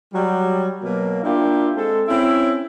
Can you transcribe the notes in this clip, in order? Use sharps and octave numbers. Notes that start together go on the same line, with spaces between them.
F#3 G3
B2 F#3 A#3
A#3 D4 E4 F4 G4
G#3 C4 A4
C4 C#4 E4